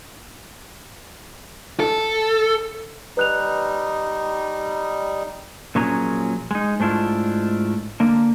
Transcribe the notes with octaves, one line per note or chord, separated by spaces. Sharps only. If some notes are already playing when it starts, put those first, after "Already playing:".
A4
G3 D#4 B4 F#6 F7
A#2 F3 F#3 C#4 G#4 A#5
G#3 D#4
G#2 A3 D4 E4 F4
D3 A#3